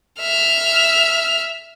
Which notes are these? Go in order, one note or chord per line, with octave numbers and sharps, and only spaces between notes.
E5 F6